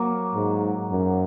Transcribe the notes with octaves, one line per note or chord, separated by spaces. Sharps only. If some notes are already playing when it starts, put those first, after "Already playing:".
Already playing: F#3 A#3
G#2
F#2